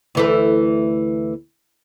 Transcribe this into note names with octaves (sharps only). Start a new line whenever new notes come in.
D2 E3 A3